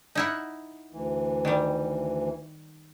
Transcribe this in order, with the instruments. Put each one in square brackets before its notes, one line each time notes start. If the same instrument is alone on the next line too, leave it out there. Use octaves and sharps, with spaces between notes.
[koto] D#4 E4 F#5
[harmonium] D2 E3
[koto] D#3 G3